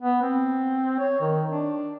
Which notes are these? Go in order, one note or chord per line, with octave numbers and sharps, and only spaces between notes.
B3
C4
C#5
D#3
D4